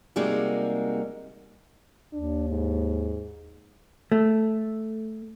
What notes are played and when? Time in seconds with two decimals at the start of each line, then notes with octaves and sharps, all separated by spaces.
0.16 C3 G3 G#3 A#3 D#4 F#4
2.13 D#2 D4
2.49 G#2
4.12 A3